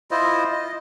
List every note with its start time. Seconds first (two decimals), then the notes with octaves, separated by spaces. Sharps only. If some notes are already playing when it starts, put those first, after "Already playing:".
0.11 E4 F4 C5 D#5
0.52 D#5